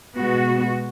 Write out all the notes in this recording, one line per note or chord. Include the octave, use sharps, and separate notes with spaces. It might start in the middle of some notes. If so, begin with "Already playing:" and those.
B2 G#3 B3 F#4